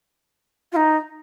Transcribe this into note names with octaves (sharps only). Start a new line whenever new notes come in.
F4
D#4